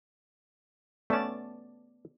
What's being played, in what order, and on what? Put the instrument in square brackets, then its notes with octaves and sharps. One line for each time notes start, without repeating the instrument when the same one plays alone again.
[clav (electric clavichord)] A3 C#4 [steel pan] B3 D5 A5